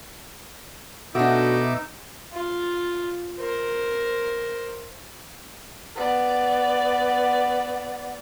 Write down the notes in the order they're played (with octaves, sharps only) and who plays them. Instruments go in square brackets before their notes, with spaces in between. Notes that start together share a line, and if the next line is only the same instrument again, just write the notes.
[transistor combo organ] B2 E5 D6 [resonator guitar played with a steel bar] A3 D4 [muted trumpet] D#4 [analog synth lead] F#4
[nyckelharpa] F4
A#4 C5
[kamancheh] B3 D5